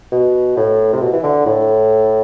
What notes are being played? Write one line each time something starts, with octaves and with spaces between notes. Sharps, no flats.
B2
A2
C3
B2
E3
D3
A2